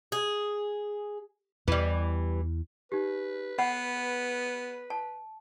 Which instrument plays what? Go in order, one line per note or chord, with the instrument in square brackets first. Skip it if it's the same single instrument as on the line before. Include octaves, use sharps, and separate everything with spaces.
[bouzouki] G#4
[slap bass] E2 [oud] E3 G3
[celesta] D#4 G4 [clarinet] B4
[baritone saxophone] B3 [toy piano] F#5 [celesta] B5
[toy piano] A5